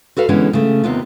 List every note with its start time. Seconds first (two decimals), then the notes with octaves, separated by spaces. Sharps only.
0.17 F#4 A4 B4 F5
0.29 D3 E3 G#3 B3 C#4
0.53 C#3 A3
0.84 D#2 C3 B3 F4